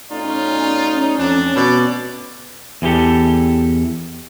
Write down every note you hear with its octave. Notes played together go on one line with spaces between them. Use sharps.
B2 A3 C#4 D#4 F4 D5
F2 E3 A3 C4 D4
B2 D5
E2 E3 F#3 G4 A4